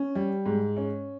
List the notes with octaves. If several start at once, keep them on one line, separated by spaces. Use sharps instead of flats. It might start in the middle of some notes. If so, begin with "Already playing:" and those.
Already playing: C#4
G3
G#2
C#4